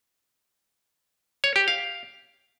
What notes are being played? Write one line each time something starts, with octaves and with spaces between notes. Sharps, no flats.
C#5
G4
F5